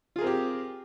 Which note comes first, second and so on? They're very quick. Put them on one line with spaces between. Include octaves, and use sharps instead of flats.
F4 G#4 A#4 C4 G4